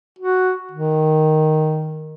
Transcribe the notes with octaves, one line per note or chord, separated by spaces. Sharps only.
F#4
D#3